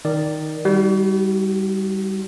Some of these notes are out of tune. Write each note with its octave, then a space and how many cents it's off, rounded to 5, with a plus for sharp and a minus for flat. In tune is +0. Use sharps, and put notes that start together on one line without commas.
D#3 +0 D5 +0
G3 +0 D#4 +40 F#4 +35